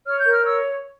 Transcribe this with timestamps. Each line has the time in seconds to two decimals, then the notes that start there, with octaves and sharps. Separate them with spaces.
0.06 C#5 F6
0.20 A#4 G6
0.32 F6
0.41 C#5 E6